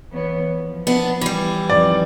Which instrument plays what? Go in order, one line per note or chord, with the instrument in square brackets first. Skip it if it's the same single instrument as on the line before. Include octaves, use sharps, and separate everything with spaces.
[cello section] E3 B3 C#5
F3
[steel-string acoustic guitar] B3 D4 E4
E3 G3
[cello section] F2 D#3 [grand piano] D5